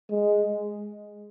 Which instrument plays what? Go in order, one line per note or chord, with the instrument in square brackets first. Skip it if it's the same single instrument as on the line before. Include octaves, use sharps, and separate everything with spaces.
[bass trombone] G#3